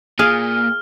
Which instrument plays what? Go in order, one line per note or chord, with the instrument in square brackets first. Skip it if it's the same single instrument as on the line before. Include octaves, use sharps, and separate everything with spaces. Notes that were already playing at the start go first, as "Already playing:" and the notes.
[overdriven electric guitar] A#2 [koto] G#4 F5 [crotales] F6